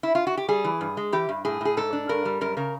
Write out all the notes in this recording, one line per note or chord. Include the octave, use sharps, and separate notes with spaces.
E4
F4
F#4
G4
G3 G#4
E3
G2
G#3
E3 G4
G2
A2 G#4
A2 G#4
G#2 A4
D4
G2 A#4
G3
F#2 A#4
C#3 A#4